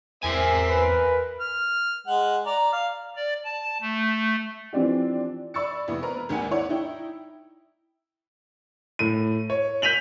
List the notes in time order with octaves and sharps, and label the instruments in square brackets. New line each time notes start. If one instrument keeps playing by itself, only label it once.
[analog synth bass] E2 [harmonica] C4 E5 [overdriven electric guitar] A#4 G#5
[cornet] B4
[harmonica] F6
G#3 F#5
D5 A#5
F5
[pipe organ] D5
A5
A3
[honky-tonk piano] E3 F3 C4 D4 G4
D5 B5 C#6 E6 A6 C#7
F1 E3 B3
A#4 B4 A#5
G#1 D#2 D#3 F#5 G#5
E4 C#5 D5 F#5
D#4 E4 G5
[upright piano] A2 D#7
C#5
G6 B6 D#7 F7 F#7